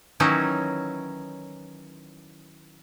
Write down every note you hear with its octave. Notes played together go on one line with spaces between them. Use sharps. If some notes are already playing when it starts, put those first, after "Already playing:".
D#3 E3 F#3 C#4 D#4 E4